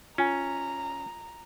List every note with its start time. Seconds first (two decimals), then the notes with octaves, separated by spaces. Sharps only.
0.18 C#4 F4 G#5 A#5